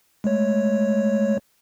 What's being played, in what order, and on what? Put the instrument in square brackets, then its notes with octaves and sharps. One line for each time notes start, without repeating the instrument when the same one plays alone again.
[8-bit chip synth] G#3 A3 C#5